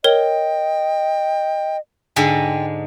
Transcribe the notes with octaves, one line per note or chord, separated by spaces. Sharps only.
A#4 C#5 D#5 G5 G7
G#2 D3 G#3 G5